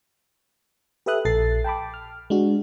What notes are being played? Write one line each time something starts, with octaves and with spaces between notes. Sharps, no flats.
G4 A4 B4 E5 D#6 F#6
A#1 A4 A6 C7
G5 A5 B5 D6
F6
G#3 D4 F#4